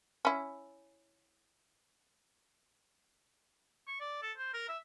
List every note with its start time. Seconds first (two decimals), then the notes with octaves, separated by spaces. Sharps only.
0.25 C#4 E4
3.87 C#6
4.00 D5
4.22 A4
4.37 C5
4.54 A#4
4.69 E5